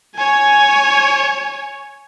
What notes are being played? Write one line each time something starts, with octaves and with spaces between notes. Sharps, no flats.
C#5 G#5